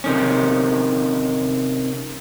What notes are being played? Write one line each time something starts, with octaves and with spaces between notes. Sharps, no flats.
C3 D#3 C#4